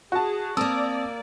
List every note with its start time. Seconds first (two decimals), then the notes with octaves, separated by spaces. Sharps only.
0.12 F#4 G#4 A5
0.57 A#3 C4 A#4 D5 A5 D#6 E6